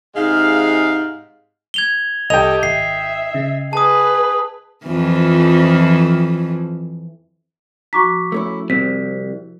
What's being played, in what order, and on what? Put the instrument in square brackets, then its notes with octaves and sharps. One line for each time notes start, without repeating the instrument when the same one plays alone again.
[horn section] G#2 C3 G#3 F5
[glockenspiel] G#6 F7 G7
[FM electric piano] C2 [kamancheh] G4 A4 [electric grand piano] D#5 G5 [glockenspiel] F7
[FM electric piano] G#1 [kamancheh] E5 [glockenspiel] C7
[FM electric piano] C#3
[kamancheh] G#4 B4 [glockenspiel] A5 D#6
[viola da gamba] F2 E3 F3
[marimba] F3 F#4 A#5 [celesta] C#6 D6 B6
[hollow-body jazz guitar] A3 C#4 E4
[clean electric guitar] C2 [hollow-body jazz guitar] C4 [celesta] B6